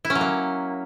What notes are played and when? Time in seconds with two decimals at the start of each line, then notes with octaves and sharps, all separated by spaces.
0.05 E4
0.10 C#4
0.15 F#3
0.21 A#3